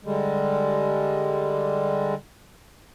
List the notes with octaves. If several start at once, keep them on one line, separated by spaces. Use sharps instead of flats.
D3 G3 G#3